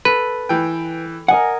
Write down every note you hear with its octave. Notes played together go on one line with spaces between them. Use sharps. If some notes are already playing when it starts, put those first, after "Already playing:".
A4 B4
E3 G5
A#4 D#5 F#5 G#5